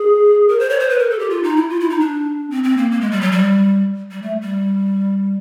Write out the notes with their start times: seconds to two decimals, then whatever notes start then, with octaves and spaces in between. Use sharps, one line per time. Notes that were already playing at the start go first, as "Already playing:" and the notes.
Already playing: G#4
0.49 A#4
0.59 C5
0.69 C#5
0.80 C5
0.90 B4
0.99 A#4
1.10 A4
1.19 G4
1.30 F4
1.43 D#4
1.56 E4
1.69 F4
1.80 E4
1.90 D#4
2.00 D4
2.51 C4
2.64 C4
2.77 A#3
2.91 A#3
3.01 G#3
3.11 G3
3.21 F#3
3.32 G3
4.11 G3
4.22 A3
4.42 G3